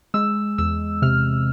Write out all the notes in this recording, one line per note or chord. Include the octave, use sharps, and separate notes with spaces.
G#3 E6
E2 E6
C3 F6